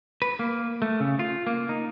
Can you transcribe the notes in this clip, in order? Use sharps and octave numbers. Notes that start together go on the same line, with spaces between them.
B4
A#3
A3
C#3
F4
A#3
D#4